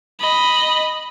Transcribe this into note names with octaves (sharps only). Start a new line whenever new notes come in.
D#5 B5